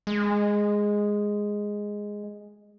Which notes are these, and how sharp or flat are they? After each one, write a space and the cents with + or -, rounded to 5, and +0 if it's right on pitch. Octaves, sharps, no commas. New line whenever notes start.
G#3 -5